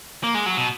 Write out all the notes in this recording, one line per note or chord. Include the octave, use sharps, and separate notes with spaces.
A#3
G#3
F#3
B2